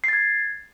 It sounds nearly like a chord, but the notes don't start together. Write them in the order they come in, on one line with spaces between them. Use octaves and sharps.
C7 A6 G#6